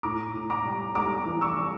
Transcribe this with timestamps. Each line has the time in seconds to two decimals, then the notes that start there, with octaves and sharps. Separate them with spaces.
0.03 A2 A#5 D6
0.34 A2
0.50 A#5 D6
0.65 G3
0.95 G3 A#5 D6
1.26 E3
1.41 C#6 E6
1.56 G3